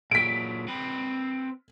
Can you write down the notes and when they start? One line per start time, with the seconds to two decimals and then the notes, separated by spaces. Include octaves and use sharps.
0.11 A#2 F#3 B6 D7
0.68 C4 B4